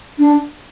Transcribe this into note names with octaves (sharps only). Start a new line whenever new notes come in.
D4